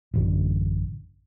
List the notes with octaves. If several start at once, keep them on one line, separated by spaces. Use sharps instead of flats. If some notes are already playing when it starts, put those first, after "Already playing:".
A1 F#2 D3